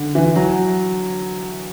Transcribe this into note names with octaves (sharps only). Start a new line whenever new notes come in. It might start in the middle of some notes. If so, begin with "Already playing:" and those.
Already playing: D3
E3
F#3